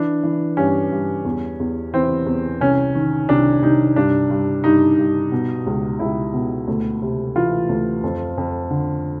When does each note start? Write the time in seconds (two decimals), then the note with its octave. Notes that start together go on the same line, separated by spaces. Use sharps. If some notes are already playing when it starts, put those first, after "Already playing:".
Already playing: E3 D4
0.24 E3
0.57 G2 C#4
0.92 G2
1.25 E2
1.60 E2
1.94 E3 C4
2.26 E2
2.60 C2 C#4
2.95 D#3
3.29 C2 D4
3.62 C2 D#4
3.96 G2 D4
4.30 G2
4.64 G2 D#4
4.99 G2
5.32 B2
5.67 C#2
5.99 C#2 E4
6.33 B2
6.68 D2
7.02 C3
7.36 E3 F4
7.69 D2
8.04 F2
8.38 F2
8.71 D3